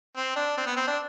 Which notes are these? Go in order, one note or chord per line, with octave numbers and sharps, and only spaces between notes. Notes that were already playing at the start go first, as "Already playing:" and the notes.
C4
D4
C4
B3
C4
D4